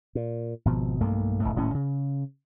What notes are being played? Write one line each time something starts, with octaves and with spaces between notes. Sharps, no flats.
A#2
G#1 B2 F3
B1 G2 A3 A#3
F1 C#2 A2 A3
D#1 A2 C#4
C#3